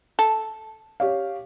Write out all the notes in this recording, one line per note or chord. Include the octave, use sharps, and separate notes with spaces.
A4
G4 C#5 F5